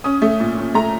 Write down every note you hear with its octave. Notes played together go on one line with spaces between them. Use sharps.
C#4 D#6
A3
A#2
A#2
A3 A#5